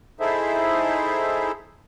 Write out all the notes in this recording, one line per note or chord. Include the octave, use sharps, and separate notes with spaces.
D#4 E4 G#4 A4 C5 E5